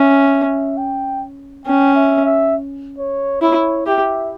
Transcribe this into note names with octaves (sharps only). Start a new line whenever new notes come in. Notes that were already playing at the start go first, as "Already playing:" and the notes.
Already playing: C#4 E5
G5
C#4 G5
E5
E5
C#5
E4 C#5
G4 E5